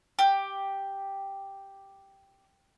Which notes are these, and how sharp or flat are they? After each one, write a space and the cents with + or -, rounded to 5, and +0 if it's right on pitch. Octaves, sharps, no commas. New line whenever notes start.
G4 +0